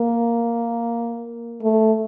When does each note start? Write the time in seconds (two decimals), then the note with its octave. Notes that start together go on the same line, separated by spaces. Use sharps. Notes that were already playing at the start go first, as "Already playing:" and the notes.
Already playing: A#3
1.63 A3